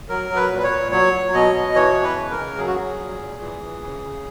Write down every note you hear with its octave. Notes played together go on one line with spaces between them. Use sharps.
F#3 A#4
F#3
B4
A#2
B4
C#5
A#2
F#3 C#5
F#3
B2 D#5
B2
E3 C#5
E3
B4
C#3
A#4
C#3
F#3 G#4
F#4
F#3 G#4
A#2
A#2
E3
E3
C#3
C#3